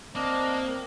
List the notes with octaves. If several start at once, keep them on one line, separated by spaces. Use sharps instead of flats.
A#3 C4 D4 D#5